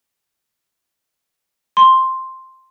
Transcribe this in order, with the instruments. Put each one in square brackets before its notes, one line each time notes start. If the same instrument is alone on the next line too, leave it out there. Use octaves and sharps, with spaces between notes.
[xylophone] C6